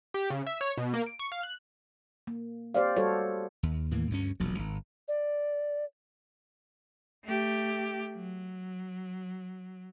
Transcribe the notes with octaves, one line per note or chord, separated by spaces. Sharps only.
G4
C#3
E5
C#5
B2
A#3
D7
C#6
F5
F#6
A#3
G4 C5 D5 F5
G3 F#4 A4 C5 C#5
D#2
D#2 A2 E3 A#3
D2 G2 A#3 C#4
E1 A#1 F#3
G#1
D5
A3 G4
F#3